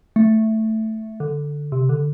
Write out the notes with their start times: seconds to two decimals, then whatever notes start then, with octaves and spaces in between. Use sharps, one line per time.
0.16 A3
1.20 D3
1.72 C3
1.89 D3